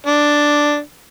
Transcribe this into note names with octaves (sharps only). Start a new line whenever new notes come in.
D4